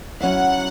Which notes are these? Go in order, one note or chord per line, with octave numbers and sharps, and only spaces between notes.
F#3 C#4 E4 F#5